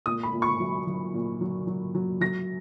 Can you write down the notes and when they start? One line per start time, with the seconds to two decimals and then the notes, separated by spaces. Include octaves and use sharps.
0.06 A#2 D#6
0.23 B5
0.33 A#2
0.42 C#6
0.60 F#3
0.87 F#3
1.14 A#2
1.41 F#3
1.67 F#3
1.95 F#3
2.21 F#3 A#6